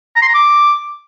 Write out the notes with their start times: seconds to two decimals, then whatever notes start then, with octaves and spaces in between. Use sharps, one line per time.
0.16 A#5
0.22 C6
0.28 A#5
0.34 D6